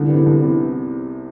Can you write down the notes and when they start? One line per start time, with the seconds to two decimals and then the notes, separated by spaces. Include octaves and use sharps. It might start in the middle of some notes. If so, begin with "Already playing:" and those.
Already playing: C2 D3
0.09 C3 E3 B3
0.26 C2
0.42 C3 E3 B3